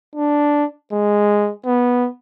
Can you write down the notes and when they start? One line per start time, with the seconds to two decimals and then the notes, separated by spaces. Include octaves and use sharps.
0.15 D4
0.92 G#3
1.66 B3